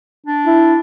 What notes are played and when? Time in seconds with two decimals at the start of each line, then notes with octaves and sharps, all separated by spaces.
0.26 D4
0.46 E4